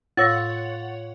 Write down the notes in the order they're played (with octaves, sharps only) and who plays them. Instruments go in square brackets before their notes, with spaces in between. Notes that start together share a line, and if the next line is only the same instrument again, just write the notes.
[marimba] A2 E6 A#6 [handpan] F4 [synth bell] C#5 F#5 [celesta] A6